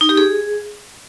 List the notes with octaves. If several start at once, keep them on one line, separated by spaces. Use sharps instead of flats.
D#4
G4
G#4